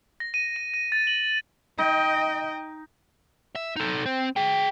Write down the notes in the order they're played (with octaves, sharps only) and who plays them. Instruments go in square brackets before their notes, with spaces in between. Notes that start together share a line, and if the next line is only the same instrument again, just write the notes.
[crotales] A#6
D#7
D#7
D#7
A6
F#7
[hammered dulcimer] D#4 [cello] D#5 G5
[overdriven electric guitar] E5
D#4 A4
C4
G#4 G5